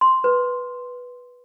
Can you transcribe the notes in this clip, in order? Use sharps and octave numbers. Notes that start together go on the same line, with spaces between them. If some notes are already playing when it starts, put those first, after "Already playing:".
C6
B4